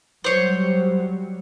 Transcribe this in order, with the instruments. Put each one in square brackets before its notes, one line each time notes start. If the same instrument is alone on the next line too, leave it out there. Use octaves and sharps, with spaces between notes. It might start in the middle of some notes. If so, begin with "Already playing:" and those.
[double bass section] F#3 G3 [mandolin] C5 C#5